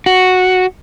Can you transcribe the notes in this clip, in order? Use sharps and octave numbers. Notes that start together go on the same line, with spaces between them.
F#4